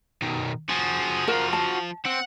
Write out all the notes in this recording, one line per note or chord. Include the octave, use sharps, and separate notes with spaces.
B2 D#3
F3 F#4 G#4
F#4 A#4 F5
A5
C4 F#5